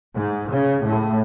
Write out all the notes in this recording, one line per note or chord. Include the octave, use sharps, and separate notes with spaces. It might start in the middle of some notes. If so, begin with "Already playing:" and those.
G#2
C#3
A2